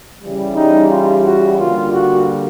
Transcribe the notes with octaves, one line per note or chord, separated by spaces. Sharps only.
C#3 E3 G3
D#4
F4
F#4
D3 G3 A#3 F4
F#4